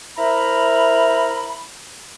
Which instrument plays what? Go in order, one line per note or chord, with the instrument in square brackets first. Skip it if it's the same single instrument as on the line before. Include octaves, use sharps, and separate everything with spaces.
[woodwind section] E4 A#4 C5 E5 A#5 B5